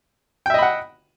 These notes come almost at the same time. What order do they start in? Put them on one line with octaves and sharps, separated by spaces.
G5 E5 D#5 B5 F#5